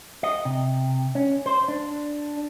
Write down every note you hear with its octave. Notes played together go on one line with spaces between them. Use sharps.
D#5
C3
C#4
C5
D4